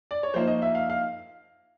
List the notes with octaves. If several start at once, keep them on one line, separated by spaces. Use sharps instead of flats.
D5
C#5
F3 A#3 D#4 C5
D#5
E5
F5
F5